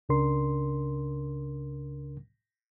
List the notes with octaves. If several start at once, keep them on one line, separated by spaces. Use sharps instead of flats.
C#2 C#3 D4 A#4 C6